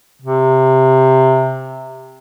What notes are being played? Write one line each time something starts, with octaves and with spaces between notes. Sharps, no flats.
C3